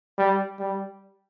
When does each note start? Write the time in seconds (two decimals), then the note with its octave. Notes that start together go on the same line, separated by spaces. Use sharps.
0.18 G3
0.60 G3